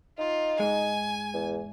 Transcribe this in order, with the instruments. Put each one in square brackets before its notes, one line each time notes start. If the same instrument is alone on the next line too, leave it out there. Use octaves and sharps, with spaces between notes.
[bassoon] D#4 [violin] F4
[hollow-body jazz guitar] G#2 G#3 [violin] G#5
[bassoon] E2